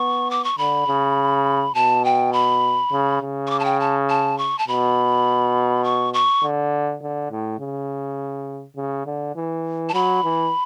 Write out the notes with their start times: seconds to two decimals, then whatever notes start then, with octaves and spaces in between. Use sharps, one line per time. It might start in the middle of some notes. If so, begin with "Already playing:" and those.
Already playing: B3 C#6
0.31 D6
0.44 C#6
0.58 D3 B5
0.87 C#3
1.75 B2 A5
2.05 G5
2.33 B5
2.92 C#3
3.22 C#3
3.47 C#6
3.50 D6
3.59 A5
3.65 G5
3.80 A5
4.09 A5
4.38 C#6
4.59 A5
4.68 B2 B5
5.84 C#6
6.14 C#6
6.43 D3
7.02 D3
7.31 A2
7.59 C#3
8.77 C#3
9.06 D3
9.36 E3
9.89 A5
9.93 F#3 B5
10.24 E3